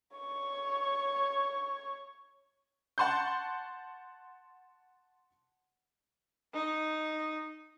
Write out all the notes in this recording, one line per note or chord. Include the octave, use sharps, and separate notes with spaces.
C#5 C#6
F#5 A5 C6 C#6 G6
D#4